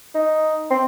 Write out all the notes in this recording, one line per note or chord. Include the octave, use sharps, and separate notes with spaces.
D#4
C4